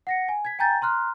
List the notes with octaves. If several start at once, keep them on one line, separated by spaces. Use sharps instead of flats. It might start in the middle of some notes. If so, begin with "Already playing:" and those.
F#5 A#6 C#7
G#5
G#6 B6
G5 G#5 A#5 G6 A6
A#5 C6 F6 F#6